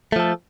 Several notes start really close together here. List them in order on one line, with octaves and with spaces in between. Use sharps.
A3 F3 A4